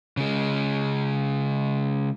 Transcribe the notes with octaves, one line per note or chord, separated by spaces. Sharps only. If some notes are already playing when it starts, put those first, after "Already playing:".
C#3 G#3